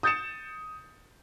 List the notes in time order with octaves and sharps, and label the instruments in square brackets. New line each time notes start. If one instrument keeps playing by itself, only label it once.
[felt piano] D#6 G6 A6 C#7 E7